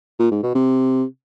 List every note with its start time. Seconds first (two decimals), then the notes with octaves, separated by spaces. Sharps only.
0.20 A#2
0.32 G#2
0.43 B2
0.55 C3